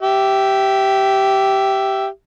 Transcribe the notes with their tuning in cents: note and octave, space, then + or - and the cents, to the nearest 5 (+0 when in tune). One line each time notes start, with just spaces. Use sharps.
G4 -10 E5 +5